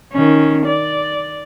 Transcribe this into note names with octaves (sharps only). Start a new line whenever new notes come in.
D#3 C#4
D5